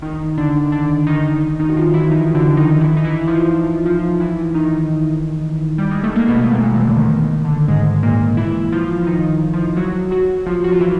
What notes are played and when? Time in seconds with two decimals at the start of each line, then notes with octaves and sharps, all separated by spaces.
0.02 D#3 D#4
0.38 D3 D4
0.72 D3 D4
1.07 D#3 D#4
1.59 D#3 D#4
1.69 F#4
1.76 F3 F4
1.94 E3 E4
2.05 E4
2.11 D#3 D#4
2.34 D3 D4
2.57 D#3 D#4
2.81 E3 E4
2.97 D#4
3.04 E3 E4
3.27 F3 F4
3.85 F3 F4
4.20 E3 E4
4.54 D#3 D#4
5.78 G3
5.91 G#3
6.04 A3
6.15 A#3
6.28 B2 B3
6.44 A3
6.51 A#2 A#3
6.75 E2 E3
6.87 D3
6.98 D#3
7.21 D#3
7.45 D3
7.68 G#2 G#3
8.03 A#2 A#3
8.37 E3 E4
8.72 F3 F4
9.07 D#3 D#4
9.53 F3 F4
9.76 F#3 F#4
10.11 F#3 F#4
10.46 F3 F4
10.64 F#4
10.72 F4
10.81 E3 E4